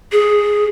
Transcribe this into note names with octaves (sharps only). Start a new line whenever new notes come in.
G#4